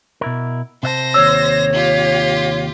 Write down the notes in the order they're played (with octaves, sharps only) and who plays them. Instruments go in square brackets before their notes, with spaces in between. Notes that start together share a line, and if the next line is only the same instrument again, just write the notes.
[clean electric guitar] B2 E4 A#4
[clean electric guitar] C3 E5 A5 [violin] C5 A#6
[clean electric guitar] D#2 C3 [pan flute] C#5 [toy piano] E6
[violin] F4 G4